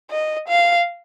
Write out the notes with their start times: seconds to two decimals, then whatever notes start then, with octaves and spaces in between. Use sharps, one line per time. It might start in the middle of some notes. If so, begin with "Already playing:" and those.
0.10 D#5
0.48 F5